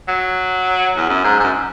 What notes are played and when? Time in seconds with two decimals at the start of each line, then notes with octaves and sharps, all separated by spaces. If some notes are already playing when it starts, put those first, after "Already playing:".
0.08 F#3
0.96 E2
1.09 F#2
1.24 G#2
1.40 G#2
1.43 F#2